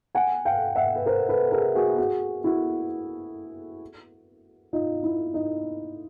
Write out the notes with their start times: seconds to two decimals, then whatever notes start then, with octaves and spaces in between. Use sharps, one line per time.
0.15 F#5 G#5
0.45 F5 G5
0.76 E5 F#5
0.96 B4
1.06 A#4 C5
1.29 A4 B4
1.52 G#4 A#4
1.75 F#4 G#4
1.98 F#4 G#4
2.44 E4 F#4
4.73 D#4 F4
5.03 E4
5.34 D#4